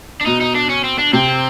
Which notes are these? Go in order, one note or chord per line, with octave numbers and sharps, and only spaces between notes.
D4
B2 D#4
D#4
D4
C#4
C4
D4
C3 C4